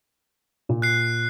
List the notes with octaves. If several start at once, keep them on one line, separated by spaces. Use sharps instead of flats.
A#2
F#6 C7